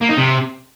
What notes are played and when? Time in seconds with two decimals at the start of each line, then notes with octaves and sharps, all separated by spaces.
0.01 A#3
0.09 D#4
0.17 C3